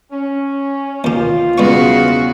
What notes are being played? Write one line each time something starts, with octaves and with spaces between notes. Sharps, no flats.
C#4
D#2 F4 G4
E2 C#3 G3 B3 F#4 C#6